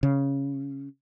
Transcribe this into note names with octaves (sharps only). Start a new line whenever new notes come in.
C#3